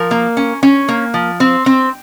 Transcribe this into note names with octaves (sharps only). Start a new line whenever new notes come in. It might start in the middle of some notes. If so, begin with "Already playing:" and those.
Already playing: F3 A#4
A#3
C#4
C#4
A#3
F3
C4
C4